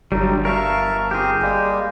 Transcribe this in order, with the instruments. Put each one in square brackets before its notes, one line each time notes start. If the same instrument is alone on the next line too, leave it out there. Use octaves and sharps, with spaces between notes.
[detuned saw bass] G1 [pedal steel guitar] D3 F#3 G3 [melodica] D#4
[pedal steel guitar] A#4 F5 [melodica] E5 A5 C#6
[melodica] C4 A#4 [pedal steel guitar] G4 G#4
[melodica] G3 G#3 A#3